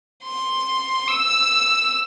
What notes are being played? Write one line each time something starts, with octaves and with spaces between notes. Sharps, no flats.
C6
E6